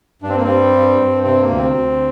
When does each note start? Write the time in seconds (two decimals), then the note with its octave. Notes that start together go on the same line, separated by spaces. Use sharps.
0.22 G2 D4
0.29 C4
0.37 A#3
0.44 G3 C4
0.73 G2
0.99 G2
1.23 C3 C4
1.41 A#3
1.49 D2
1.57 C4
1.75 D2